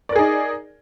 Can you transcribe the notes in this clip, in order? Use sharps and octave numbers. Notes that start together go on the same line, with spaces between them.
D#4 G#4 A#4 D5